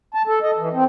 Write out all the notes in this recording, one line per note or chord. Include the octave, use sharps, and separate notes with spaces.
A5
A4
D#5
E3
C4